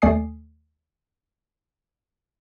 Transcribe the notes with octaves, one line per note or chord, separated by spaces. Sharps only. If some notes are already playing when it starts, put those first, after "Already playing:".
D#2 A3 D5 G#5 D#6 C7